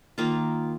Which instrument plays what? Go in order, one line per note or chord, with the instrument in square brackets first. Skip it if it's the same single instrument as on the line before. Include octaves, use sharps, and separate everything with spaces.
[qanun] D#3 A#3 F4